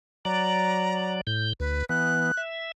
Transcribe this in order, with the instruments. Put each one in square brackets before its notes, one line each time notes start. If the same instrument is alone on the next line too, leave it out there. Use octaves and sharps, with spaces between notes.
[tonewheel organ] F#3 D5 [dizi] A#5
[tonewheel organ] A2 G6
[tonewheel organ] D2 [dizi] B4
[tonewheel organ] E3 B3 [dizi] F#6
[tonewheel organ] E5